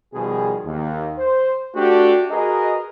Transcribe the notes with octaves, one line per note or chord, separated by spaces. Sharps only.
B2 D#3 F3 G3 G#4
D#2
C5
A3 D4 F#4 G4
F#4 G#4 A#4 B4 D#5